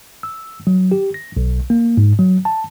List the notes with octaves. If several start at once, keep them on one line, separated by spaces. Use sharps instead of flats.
E6
F#3
G4
A#6
B1
A#3
G#2
F#3
A5